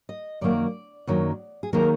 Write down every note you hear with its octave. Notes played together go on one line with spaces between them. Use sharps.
D#5
F#2 D#3 F#3 A#3 D5
F#2 D#3 F#3 A#3
G#4
D#3 F#3 A#3 A#4